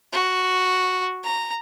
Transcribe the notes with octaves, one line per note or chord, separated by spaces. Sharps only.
F#4
A#5